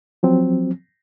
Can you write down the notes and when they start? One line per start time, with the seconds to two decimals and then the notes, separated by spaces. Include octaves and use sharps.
0.23 F3 F#3 C4